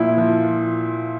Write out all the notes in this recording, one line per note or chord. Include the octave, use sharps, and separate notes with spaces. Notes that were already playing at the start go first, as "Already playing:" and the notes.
Already playing: A#2 F3 E4
F3